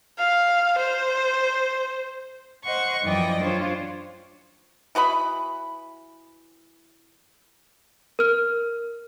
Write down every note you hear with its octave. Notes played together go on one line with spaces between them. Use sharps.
F5
C5
C5 D#5 F#5 C#6
F#2 E3 F3 D5 D#5 G5
D4 F4 C5 C#5
E3 F#4 D#5 B5
A#4 F6